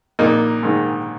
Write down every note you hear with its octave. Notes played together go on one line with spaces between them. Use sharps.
A#1 A#3 D#4
G#2 D#3 G#3